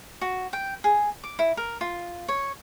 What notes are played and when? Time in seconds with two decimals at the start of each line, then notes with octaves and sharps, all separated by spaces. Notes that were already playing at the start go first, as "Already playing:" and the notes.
0.21 F#4
0.53 G5
0.84 G#4
1.24 D6
1.39 E4
1.57 A#4
1.81 F4
2.28 C#5